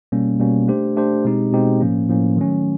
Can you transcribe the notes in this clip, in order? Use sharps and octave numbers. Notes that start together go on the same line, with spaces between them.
B2 G3 A#3 C#4
B2 G3 A#3 C#4
A3 D4 G4 C5
A3 D4 G4 C5
B2 G#3 C4 D#4 G4
B2 G#3 C4 D#4 G4
A2 F3 A#3 C#4
A2 F3 A#3 C#4
D#3 F#3 A3 C#4